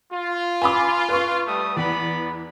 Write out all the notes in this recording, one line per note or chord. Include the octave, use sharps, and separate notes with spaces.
F4
G#5 B5 D6
B4 C#6
G3 A3 D#6
E2 B3 D5 B5